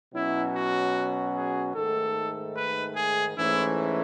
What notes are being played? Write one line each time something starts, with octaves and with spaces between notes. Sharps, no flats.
B2 F#3 C#4 E4
F#4
G#4
G#2 D#3 A3 A4
B4
G#4
G#2 E3 A3 C#4 E4